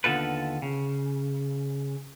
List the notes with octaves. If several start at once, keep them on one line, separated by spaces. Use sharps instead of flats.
D#2 D3 B3 F4 A4 B4
C#3